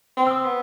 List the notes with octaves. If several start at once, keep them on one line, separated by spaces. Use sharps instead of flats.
C4
E6
D#6
B3